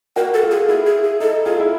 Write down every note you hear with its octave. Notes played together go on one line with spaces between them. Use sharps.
F#4 A#4
A4
F4
G#4
E4 G#4
G#4
G#4
D#4 A4
F4 G#4
E4